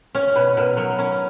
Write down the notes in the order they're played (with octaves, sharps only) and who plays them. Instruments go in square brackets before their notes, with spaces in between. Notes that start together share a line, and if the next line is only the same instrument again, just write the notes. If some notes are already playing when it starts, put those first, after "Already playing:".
[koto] C#4 [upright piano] C#5
[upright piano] C#5
[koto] B2 [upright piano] B4
[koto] B2 [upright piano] A#4
[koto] F#3 [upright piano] A#4
[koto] C#4 [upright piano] A#4